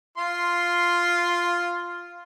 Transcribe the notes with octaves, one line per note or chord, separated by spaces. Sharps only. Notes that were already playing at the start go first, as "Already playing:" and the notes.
F4 C6